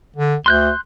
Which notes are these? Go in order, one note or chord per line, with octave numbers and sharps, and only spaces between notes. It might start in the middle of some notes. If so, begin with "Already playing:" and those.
D3
D2 C6 F#6 G6